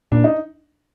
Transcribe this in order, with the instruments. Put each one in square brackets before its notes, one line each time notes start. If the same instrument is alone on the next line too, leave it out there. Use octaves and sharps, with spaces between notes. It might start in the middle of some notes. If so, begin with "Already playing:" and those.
[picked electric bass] A#2 [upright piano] D4
[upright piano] D#4